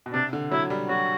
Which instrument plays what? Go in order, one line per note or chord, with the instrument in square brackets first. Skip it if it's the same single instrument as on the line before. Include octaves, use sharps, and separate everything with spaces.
[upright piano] B2
[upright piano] C3 [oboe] D4
[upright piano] D3
[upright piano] F#3 [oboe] E4
[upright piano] G3
[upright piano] F#3 [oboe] F#4